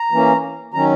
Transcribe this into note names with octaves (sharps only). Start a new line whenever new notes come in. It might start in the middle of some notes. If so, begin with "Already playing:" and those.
Already playing: A#5
E3 A#3 C#4
D#3 F#3 C#4 A#5